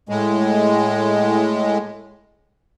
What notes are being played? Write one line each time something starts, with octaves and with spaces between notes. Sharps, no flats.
A2 G#3